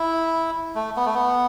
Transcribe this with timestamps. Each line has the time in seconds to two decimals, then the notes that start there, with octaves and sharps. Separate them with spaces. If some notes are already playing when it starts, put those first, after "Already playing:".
Already playing: E4
0.75 A3
0.97 B3
1.05 A3
1.14 B3